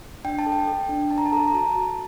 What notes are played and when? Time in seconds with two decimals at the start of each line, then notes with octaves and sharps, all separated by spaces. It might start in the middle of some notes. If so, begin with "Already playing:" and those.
0.24 D4 G5
0.39 A5
0.46 A4
0.52 G5
0.67 A4
0.89 D4
1.11 D4 A5
1.18 A#5
1.26 A5
1.32 A4 A#5
1.40 A5
1.48 A#5
1.54 F#4 A5
1.75 F#4